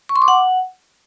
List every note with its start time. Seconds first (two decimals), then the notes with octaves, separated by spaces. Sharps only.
0.09 C#6
0.16 C6
0.22 D6
0.28 F#5